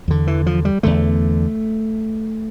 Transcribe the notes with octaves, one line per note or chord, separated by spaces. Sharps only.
E2 D3
E3
F3
G3
E2 D3 A3